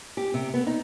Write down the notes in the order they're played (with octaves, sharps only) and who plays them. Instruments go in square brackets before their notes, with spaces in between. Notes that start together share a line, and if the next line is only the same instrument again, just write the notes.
[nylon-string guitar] G4
C3
B3
D#4